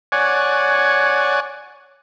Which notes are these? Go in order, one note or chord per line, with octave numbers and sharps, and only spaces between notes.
C#5 D5 F#5 G#5